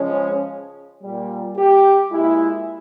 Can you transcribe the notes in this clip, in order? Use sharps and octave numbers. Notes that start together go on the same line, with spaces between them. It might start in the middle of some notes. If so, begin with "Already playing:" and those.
Already playing: C#3 F3 G#3 C#4
A#2 G3
G4
A#2 G#3 E4